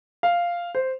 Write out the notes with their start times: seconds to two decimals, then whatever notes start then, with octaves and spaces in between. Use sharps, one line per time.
0.23 F5
0.75 C5